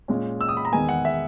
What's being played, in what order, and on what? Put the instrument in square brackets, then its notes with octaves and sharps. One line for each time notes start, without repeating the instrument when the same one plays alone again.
[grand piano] A#2 G#3 C#4
E6
D#6
B5
A#5
E2 D#3 G#3 B3 G#5
F#5
E5